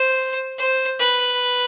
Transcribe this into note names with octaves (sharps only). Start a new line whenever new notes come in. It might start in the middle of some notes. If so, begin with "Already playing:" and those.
Already playing: C5
C5
B4